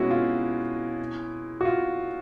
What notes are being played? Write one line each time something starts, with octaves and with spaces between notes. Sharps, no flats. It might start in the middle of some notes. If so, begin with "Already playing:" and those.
Already playing: B2 G#3 C#4 E4 F#4
F4
F#4
F4